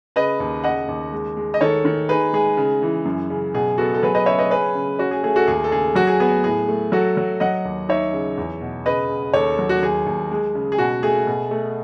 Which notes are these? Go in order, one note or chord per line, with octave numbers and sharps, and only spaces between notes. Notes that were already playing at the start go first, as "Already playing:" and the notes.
C#3 B4 D#5
D#2
C#3 D#5 F#5
D#2
G#3
G#3
D#5
D#3 A4 C#5
D#3
D#4 G#4 B4
G#3 G#4
C#3
E3
F#2
C#3
B2 G#4
B3 F#4 A4
A4
F#3 G#4 B4
B4 D#5
C#3 C#5 E5
B4 D#5
C#4 G#4 B4
C#3
C#4 F#4
G#4
A3 G#4
F#4 A4
D#2 G#4
A4
C#3 G#4
F#3 F#4
G#4
B3 G#4
A2 G#4
A3
F#3 F#4 A4
F#3
F#3 D#5 F#5
D#2
D#4 C#5 E5
C#3
E2
B2
C#3 B4 D#5
C#3
D#2 A4 C#5
F#3
F#4
D#2 G#4
D#2
G#3
C#3
G#4
B2 F#4
A3 G#4
B2
A3